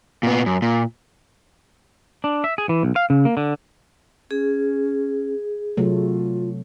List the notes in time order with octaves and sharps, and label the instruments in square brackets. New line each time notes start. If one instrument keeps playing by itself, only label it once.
[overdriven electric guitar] A#2 B3
F#2
A#2
[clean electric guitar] D4
E5
G#4
E3
B1
F5
C#3
A#3
D3
[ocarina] C#4 [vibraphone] G#4
[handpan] C3 F#3 A3 [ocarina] F4